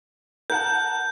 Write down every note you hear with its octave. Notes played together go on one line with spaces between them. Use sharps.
A#4 F#5 A5 G6